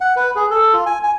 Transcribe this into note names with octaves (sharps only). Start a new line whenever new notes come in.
F#5
B4
G#4
A4
F4
G#5
G#5